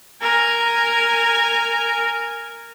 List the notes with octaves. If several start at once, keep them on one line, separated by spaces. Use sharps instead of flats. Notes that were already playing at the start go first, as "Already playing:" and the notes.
A#4 G#5